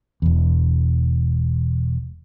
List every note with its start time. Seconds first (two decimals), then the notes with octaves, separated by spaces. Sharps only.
0.22 E1 E2